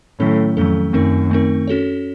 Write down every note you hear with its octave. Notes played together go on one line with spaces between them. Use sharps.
A2 D#3 F#3 A3 C#4 A4
F2 D#3 F#3 A3 C#4 A4
F#2 D#3 A3 C4 D#4 A#4
D#3 A3 C4 D#4 A#4
C#4 F#4 A4 C#5